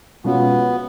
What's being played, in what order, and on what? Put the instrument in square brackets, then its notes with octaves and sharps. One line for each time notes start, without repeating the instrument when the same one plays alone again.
[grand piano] B2 G#3 C#4 F4 [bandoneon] B3